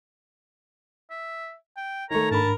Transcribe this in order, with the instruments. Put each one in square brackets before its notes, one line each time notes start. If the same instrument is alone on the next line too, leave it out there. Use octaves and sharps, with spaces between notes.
[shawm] E5
G5
[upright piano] D#3 A3 [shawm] C#5 [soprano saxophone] A#5
[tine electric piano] G#2 D4 B5 [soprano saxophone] A#4 [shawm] A5